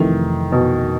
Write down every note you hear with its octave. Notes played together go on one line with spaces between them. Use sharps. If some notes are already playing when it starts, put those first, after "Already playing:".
Already playing: F2 C3 D#3 E3 A3
B2